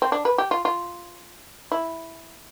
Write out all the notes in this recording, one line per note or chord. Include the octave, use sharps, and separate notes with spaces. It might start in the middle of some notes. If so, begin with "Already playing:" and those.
C4
D4
B4
G4
F4
F4
E4